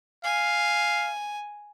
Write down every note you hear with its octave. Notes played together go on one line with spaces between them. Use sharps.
F5 G#5